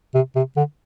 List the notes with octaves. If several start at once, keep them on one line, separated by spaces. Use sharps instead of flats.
C3
C3
D3